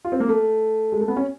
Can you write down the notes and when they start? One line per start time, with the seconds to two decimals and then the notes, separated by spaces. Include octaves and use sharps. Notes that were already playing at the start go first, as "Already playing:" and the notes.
0.05 F4
0.12 C4
0.20 A#3
0.29 A3
0.92 G#3
1.01 A3
1.08 B3
1.16 C#4